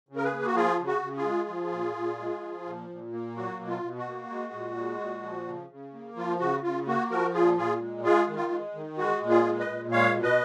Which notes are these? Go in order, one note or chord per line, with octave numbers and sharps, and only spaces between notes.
C#3
A#4
G#4 B4
A#3
F#4
F3 F4 G#4
C#3
F#4
C#3
F4 G#4
G#3
F3
A#2
A#2
G#3
F3
A#2
A#2
A#3
F#3 F#4
B2
F4
B2
F#4
A#3
G#3
A#2
G#3
A#2
F3
C#3
C#3
A#3
F3 F4
C#3 F#4
C#3 F4
A#3 F#4
F3 F#4 A#4
A#2 F4 G#4
A#2 F4 G#4
G#3
G#3 F4 G#4
D#3
F4
G#3
D#3
G#3 F#4
A#2
F4 G#4
G#3
B4 D#5
A#2
G#3 C#5 F5
B2
B4 D#5